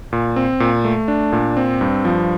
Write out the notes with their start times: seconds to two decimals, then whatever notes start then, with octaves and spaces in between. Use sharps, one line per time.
0.13 A#2
0.36 C4
0.60 A#2
0.85 A3
1.08 D4
1.32 A#2
1.57 C4
1.81 G2
2.05 F3